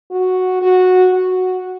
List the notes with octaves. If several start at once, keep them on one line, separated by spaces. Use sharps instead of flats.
F#4
F#4
F#4